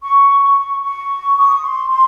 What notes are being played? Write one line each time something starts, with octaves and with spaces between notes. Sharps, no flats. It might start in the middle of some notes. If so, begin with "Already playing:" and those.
C#6
C#6
C#6
D#6
C#6
C6
C6